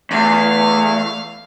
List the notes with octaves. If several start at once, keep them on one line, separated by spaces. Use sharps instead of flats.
E2 A3 F5